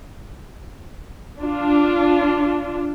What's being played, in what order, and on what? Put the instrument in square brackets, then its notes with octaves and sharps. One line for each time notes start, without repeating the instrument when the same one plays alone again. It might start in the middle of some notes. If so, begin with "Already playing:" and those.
[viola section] D4 F4